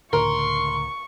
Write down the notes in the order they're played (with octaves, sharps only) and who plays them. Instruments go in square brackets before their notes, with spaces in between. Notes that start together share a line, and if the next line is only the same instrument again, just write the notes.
[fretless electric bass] C#2 A2 D3 [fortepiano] A#4 [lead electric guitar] C6 [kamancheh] C#6